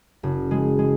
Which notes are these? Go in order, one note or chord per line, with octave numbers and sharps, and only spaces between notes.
F#1
G#3
G#3